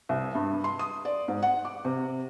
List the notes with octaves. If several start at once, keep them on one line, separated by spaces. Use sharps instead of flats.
C2
G2
C6
D#6
D5
G#2
F#5
D6
C3